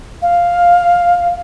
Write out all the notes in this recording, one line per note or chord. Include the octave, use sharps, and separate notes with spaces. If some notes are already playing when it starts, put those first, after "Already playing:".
F5